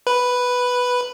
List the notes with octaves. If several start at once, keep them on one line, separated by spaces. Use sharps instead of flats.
B4